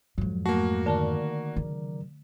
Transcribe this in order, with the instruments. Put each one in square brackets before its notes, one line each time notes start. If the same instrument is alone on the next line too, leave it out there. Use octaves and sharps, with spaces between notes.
[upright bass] F2 G#2 [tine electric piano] F#3
[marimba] A3 [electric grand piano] A#3 F#4
[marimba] D3 A5 [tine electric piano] D#3 A#4 D5
[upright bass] C#3 F#3